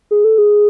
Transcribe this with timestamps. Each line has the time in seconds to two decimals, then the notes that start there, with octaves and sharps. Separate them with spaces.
0.11 G#4
0.24 A4
0.38 G#4